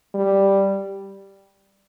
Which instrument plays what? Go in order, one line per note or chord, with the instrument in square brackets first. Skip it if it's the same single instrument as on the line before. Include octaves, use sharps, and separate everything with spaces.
[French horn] G3